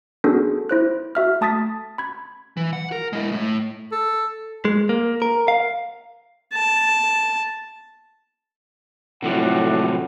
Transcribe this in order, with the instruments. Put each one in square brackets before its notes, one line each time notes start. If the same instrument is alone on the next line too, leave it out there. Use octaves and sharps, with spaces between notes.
[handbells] B3 C#4 D4 F#4 G#4 A4
E4 C5 F#6
F#4 E5 F6
A3 A5 D#6 A6 B6
B5 G#6
[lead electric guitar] E3
F#5
A#4
G#3 E4
A2
[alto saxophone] A4
[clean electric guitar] G#3
A#3
A#4
F5
[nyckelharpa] A5
[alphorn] A2 [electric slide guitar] C3 F3 F#3 [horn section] A4 D5 F#5